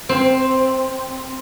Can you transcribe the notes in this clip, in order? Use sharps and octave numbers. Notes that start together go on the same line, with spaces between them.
C4